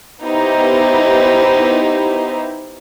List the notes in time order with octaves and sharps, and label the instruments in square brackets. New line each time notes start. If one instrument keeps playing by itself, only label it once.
[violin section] B3 D#4 E4 G4 C5